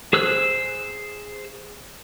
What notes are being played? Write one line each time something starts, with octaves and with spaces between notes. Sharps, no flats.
G#4 C5 E6 F#6